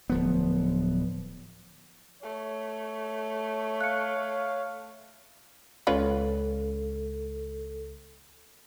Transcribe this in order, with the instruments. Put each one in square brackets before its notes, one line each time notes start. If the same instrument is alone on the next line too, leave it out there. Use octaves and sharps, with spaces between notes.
[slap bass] D1 F3 B3
[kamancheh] A3 [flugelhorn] C#5
[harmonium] F5 [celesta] F#6 C#7
[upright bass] C#2 [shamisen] C#4 F4 B4 [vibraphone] A4